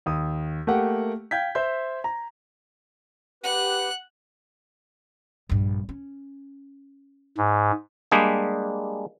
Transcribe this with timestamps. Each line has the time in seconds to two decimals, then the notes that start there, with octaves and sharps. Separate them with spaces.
0.06 D#2 D#6
0.67 A3 A#3 G4 F#5 G5
1.31 F5 G5 G6 G#6 B6
1.55 C5 E5 C6 G6
2.04 A#5
3.44 G4 B4 F#5 F#6
5.50 A#1 G2
5.89 C#4
7.38 G#2
8.12 G3 G#3 A#3 D4 G4 G#4